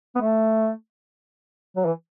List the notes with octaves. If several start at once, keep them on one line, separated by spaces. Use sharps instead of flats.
B3
A3
F#3
E3